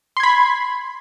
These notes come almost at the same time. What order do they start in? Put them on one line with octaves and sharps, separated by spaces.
C6 G#6 B5